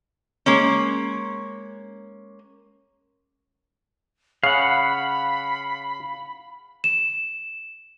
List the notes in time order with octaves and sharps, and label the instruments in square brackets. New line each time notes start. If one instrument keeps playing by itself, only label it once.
[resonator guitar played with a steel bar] G#3 A#3 C#4
[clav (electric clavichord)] C#3 [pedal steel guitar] F5 F#5 [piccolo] B5
[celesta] E7